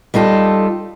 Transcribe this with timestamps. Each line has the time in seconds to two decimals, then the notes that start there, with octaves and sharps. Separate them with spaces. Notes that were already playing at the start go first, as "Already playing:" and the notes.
0.14 G3 D#4 F4 A4